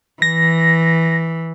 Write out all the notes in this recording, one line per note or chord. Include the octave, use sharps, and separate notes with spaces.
E3 A#6